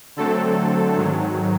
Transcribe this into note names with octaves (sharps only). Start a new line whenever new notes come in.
D3 F#3 A3 C4 A4
G#2 D#3 F#3